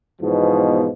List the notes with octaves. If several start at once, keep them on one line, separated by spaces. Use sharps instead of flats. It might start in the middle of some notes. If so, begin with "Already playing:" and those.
E2 G#2 B2 F3